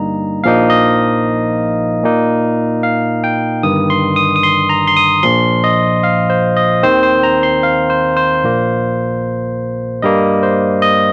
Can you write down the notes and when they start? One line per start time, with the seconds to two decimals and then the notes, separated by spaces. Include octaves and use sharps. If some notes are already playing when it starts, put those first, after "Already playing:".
Already playing: G1 G2 G3 A#3 D#4 A#5
0.44 A#1 A#2 F3 A#3 D#4 F5
0.70 D#5
2.03 A#2 A#3 D#4
2.83 F5
3.24 G5
3.63 G1 G2 D#3 D#6
3.90 C6
4.16 D#6
4.36 D#6
4.43 C6
4.69 A#5
4.87 C6
4.97 D#6
5.23 A#1 A#2 F3 C6
5.64 D#5
6.03 F5
6.30 C5
6.57 D#5
6.83 D#2 D#3 C4 C5
7.03 C5
7.23 A#5
7.43 C6
7.63 F5
7.90 C5
8.17 C5
8.43 A#1 A#2 A#3
10.02 G2 G3 A#3 D#5
10.43 C5
10.82 D#5